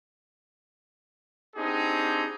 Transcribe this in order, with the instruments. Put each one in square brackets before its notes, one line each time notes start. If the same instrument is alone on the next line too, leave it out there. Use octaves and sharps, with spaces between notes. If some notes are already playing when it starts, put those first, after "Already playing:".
[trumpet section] B3 C4 D4 D#4 G4 G#4